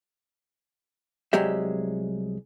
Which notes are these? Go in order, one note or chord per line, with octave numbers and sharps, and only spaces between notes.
C2 F#3 G#3 G4 E5